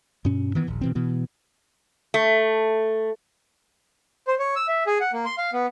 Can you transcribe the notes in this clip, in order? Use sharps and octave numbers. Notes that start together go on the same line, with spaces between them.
G2 B2 C#4
D#3 E3 B3
D#1 A#1
B2 E3 C4
B2 E3 B3
A3
C5
C#5
E6
E5
G#4
F#5
A#3
C6
F5
B3